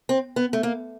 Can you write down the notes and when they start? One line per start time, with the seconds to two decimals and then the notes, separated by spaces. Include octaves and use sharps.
0.09 C4
0.36 B3
0.53 A3
0.63 A#3